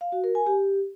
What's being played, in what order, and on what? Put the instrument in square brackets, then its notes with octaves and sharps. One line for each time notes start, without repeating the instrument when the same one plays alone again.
[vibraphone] F5
F#4
A#4
G#5
G4